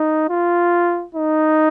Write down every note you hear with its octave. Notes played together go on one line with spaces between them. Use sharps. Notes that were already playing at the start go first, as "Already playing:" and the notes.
Already playing: D#4
F4
D#4